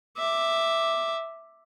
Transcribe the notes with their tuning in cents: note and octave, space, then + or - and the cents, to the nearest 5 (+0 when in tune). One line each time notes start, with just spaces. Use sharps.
E5 +0 D6 +5